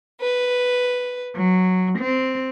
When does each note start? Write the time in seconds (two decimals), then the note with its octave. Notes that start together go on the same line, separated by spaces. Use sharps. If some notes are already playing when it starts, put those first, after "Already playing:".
0.21 B4
1.36 F#3
1.99 C4